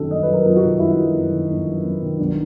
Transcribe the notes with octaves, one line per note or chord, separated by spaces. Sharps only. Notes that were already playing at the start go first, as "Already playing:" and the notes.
Already playing: G1 F#2 D#3 F#3 A4
G1 D#5
F#3 B4
A#4
F#2 F4
F#4
D#3
G1 E4
F#3
F#2
D#3
G1
F#3
F#2
D#3
B1 D4